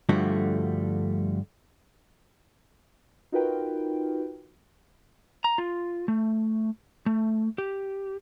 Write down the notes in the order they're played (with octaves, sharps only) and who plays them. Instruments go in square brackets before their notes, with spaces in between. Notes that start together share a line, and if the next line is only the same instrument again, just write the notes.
[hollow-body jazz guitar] G2 D3 F3 G3 A3 F#4
[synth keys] D#4 F4 F#4 A#4 B4 G5
[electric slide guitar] A#5
F4
A3
A3
G4